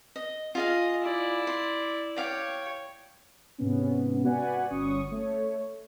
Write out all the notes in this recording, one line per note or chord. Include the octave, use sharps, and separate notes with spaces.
D#5
F4 G#4 D#5 F5
E4 D5
C6
C#5 D5 F5 G5 D6
G#2 C3 B3 C#4
F#4 B4 D5 F#5 G#5
G1 C#4 C#6 D#6
A3 C#5